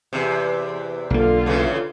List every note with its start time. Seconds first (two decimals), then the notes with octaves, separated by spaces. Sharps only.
0.13 E2 C3
1.10 B1 D3 A#3 F4
1.46 A2 C#3 E3